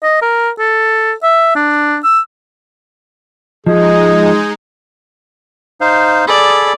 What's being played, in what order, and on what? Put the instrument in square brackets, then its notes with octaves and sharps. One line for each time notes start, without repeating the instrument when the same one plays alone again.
[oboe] D#5
A#4
A4
E5
D4
E6
[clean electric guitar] F3 [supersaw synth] G#3 D#4 [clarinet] G#4 [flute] D#5
[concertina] D#4 C5 F5
[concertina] G#4 A4 B5 [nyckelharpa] D5